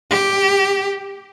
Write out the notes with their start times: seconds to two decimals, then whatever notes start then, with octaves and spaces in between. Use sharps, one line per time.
0.11 G4